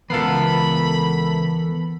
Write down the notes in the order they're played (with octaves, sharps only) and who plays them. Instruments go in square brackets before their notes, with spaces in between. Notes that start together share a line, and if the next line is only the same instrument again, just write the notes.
[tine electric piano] C#2 A#4 C7 [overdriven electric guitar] E3 F5 [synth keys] B3 A4 [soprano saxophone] B5